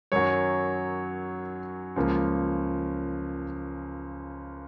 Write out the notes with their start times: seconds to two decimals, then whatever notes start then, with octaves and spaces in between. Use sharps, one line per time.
0.12 F#2 D#3 F#3 C#5
1.96 C#2 C#3 F3 A#3